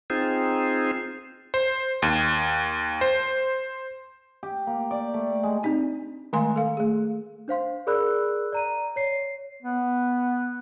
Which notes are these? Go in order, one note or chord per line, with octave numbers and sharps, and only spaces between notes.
C4 D#4 F4 G#4 C5
C5
D#2
C5
G4
A#3
D5
A3
G#3
C4 D4 D#4 G4
D#3 G#3 A3 F5 G#5 C6
A4 F5
A3 G#4
D4 C5 F5 C6
G#4 A#4 D5 B5 E6 F#6
D5 A#5 D#7
C#5 C7
B3